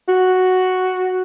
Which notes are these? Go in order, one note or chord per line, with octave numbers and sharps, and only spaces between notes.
F#4